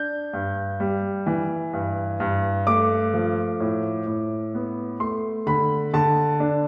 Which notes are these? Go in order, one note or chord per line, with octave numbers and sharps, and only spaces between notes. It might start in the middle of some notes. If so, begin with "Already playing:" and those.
Already playing: D4 G6
G2
G3
E3
G2
G2
A3 D6
F3
A2
A2
B3
A3 C6
D3 B5
D3 A5
D4